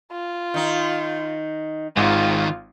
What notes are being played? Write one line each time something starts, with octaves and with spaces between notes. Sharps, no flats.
F4
D#3 D#4
G#1 G#2 D#3 G#3 F4